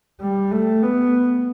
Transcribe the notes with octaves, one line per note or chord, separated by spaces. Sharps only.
G3
A3
B3